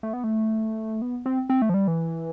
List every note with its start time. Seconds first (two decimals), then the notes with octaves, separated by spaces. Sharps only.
0.03 A3
0.13 B3
0.24 A3
1.02 B3
1.26 C4
1.50 C4
1.62 A3
1.69 F3
1.74 G3
1.87 E3